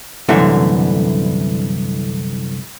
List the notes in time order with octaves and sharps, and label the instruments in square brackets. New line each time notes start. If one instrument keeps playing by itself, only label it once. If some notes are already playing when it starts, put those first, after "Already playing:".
[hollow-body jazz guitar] C2 F#2 D3 E3 A3 F#5